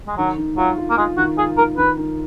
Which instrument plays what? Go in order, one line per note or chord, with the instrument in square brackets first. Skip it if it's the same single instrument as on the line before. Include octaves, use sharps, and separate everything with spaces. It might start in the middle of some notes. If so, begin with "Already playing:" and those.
[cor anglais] G#3
[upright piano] D#3 [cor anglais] F#3
[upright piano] D#3
[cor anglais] F#3 [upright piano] F4
[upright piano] F4
[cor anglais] A#3
[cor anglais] G#3 [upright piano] F4
[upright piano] D#3 [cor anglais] F#4
[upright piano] F4 [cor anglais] G#4
[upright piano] D#3 [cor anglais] A#4
[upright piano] D#3 [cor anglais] B4
[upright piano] D#3